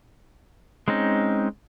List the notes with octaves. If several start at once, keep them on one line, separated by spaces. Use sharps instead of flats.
G#3 C4 C#4 D#4